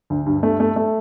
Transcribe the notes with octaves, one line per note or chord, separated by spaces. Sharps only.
D2
G2
A3
A3
A3